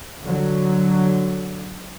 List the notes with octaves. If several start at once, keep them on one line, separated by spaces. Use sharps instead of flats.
D3 F#3